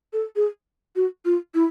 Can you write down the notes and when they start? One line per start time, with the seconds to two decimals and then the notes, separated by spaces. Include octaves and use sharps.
0.13 A4
0.36 G#4
0.96 F#4
1.25 F4
1.54 E4